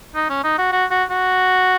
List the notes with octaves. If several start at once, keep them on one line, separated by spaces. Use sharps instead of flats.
D#4
C#4
D#4
F#4
F#4
F#4
F#4